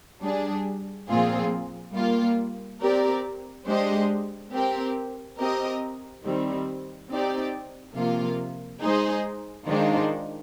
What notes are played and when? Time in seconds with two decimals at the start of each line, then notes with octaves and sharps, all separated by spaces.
0.22 G3 D4 G#4
1.08 A#2 F3 C4 F4 G#4
1.95 G3 A#3 F4
2.81 C4 G4 A#4 D5
3.67 G#3 D4 G4 C5 D#5
4.52 C4 G4 A#4
5.38 C4 G4 A#4 D#5
6.24 D#3 G3 C4
7.09 C4 D#4 G4 D5
7.95 C3 F3 A#3 F4
8.81 G#3 D#4 G#4 C5 D#5
9.67 D#3 G#3 D4 F4 C5